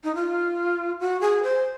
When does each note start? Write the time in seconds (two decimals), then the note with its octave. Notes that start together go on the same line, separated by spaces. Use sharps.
0.04 D#4
0.15 F4
1.00 F#4
1.21 G#4
1.43 C5